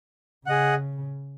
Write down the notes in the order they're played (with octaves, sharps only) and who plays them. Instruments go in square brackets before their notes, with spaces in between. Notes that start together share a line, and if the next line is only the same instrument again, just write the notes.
[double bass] C#3 [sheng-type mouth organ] G#4 D#5 F#5